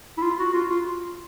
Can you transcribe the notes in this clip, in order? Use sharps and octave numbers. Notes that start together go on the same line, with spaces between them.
E4
F4
F#4
F4
F4